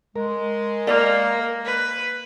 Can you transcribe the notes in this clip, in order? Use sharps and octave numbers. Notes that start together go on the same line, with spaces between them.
G#3 A#4
A#3 D5 D#5 A#5
B4